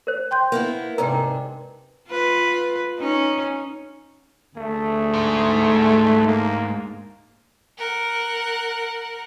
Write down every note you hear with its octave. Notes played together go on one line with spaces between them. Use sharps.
A#4 C5
G5 C6 G6
A#3 B3 E4
G#2 C3 D4 A#4 B4 G5 A#5
A#4
F4 B4
C#4 D#4
D2 A3 G#4
G#2
A#3
A#4 F#5